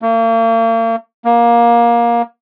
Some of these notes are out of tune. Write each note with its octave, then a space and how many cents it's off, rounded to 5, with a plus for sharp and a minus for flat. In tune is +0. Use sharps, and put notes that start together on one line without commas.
A#3 -40
A#3 +20